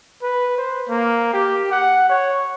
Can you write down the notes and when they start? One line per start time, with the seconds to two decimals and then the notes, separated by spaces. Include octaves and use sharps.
0.22 B4
0.58 C5
0.88 A#3
1.33 G4
1.71 F#5
2.09 C#5